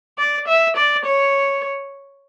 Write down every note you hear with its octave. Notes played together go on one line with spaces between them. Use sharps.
D5
E5
D5
C#5